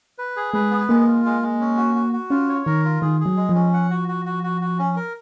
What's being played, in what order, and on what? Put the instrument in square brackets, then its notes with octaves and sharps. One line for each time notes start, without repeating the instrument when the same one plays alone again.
[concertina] B4
G#4
[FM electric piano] G#3 [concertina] B4
[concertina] B3
[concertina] G#3 [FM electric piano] A#3
[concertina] F4
G#3
G#3
C#4
F#4
F#4
F#4
[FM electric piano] C#4 [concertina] F4
[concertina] C#5
[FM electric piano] D#3 [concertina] A#4
[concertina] F4
[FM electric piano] D#3 [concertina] G#4
[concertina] G#4
[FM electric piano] F#3
[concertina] G#3
[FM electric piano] F3
[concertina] C#4
F#5
F#4
F#4
F#4
F#4
F#4
C#4
A#4